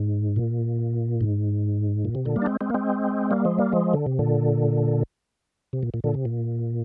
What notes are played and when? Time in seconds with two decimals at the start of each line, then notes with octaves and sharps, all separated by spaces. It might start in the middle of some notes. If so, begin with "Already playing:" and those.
Already playing: G#2
0.36 A#2
1.21 G#2
2.05 A#2
2.15 C3
2.25 A#2 D3
2.36 G3 A#3
2.42 D4
2.46 G#3 C4
2.61 G#3 C4
2.70 A#3
2.74 G#3 C4
3.31 G3 A#3
3.45 F3 G#3
3.59 G3 A#3
3.72 F3 G#3
3.94 D3
4.06 C3
4.19 A#2 D3
5.73 C3
5.83 A#2
5.94 A#2
6.04 A#2 D3
6.14 C3
6.25 A#2